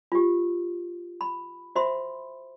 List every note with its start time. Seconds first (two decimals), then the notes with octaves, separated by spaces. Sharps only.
0.12 F4 G4
1.21 B5
1.76 F#4 C5 E5 B5 C6